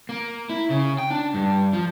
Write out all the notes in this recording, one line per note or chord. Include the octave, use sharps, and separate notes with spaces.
A#3
E4
C#3
G5
D4
G2
F3